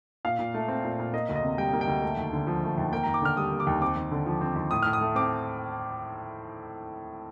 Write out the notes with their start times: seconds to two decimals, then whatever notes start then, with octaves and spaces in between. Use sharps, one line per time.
0.25 A#2 F5
0.39 A#2
0.54 A3
0.68 C4
0.84 A#2
0.99 A#2
1.13 A#3 D#5
1.29 D2
1.36 D#5
1.43 C3
1.58 G3 G5
1.73 A#3
1.81 G5
1.88 D2
2.03 A3
2.17 D#2
2.33 D3
2.47 F3
2.63 A3
2.78 D#2
2.92 A#3 G5
3.03 D#2 A#5
3.14 D6
3.22 D3 F6
3.37 G3 D#6
3.52 A#3
3.60 D6
3.67 D#2
3.81 C4 D6
3.96 D#2
4.11 D3
4.26 F3
4.41 C4
4.56 D#2
4.71 A2 D#6
4.83 A2 F6
4.93 D#6
5.01 A3
5.15 C4 D6